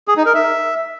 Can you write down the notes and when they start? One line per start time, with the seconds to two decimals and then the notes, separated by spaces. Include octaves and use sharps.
0.08 G#4
0.17 D#4
0.26 A#4
0.35 E5